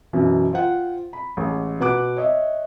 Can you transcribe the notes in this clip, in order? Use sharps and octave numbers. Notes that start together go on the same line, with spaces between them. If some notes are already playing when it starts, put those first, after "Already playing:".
F#2 B2 E3
F4 C5 F#5 G5
B5
A1 G#3
B2 B4 F#5 D6 F#6
C#5 D#5 E5